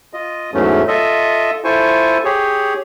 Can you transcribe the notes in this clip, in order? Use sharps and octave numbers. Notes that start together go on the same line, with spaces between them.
F4 D#5
E2 G#2 E3 F#3 A3 C#4
F4 A4 D#5 E5
E4 F4 A4 C5 G#5 C#6
G4 G#4 C#5